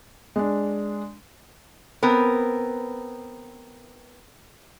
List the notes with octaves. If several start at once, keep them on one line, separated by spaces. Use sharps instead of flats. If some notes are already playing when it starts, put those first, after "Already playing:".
G#3 D4
B3 C4 A#4